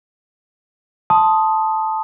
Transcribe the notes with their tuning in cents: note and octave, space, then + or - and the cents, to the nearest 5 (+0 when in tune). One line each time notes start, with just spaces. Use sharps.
A5 -5 C6 +0 D#6 +0